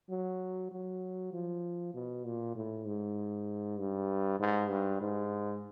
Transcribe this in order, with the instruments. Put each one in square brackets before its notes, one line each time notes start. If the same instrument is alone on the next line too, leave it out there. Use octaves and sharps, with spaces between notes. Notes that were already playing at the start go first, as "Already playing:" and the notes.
[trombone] F#3
F#3
F3
B2
A#2
A2
G#2
G2
G#2
G2
G#2